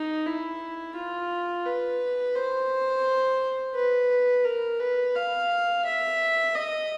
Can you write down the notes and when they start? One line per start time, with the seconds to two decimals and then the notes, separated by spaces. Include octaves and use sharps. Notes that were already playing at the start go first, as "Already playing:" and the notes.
Already playing: D#4
0.26 E4
0.95 F4
1.66 B4
2.35 C5
3.75 B4
4.45 A#4
4.79 B4
5.15 F5
5.85 E5
6.55 D#5